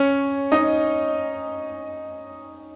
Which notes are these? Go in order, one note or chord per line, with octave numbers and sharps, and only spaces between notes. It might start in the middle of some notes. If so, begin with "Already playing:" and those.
Already playing: C#4 C#5
D#4 D#5